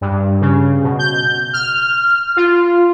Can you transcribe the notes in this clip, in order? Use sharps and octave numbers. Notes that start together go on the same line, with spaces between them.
G2
C#3
B2
G6
F6
F4